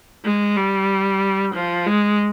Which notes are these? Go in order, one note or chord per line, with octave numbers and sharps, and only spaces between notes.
G#3
G3
F3
G#3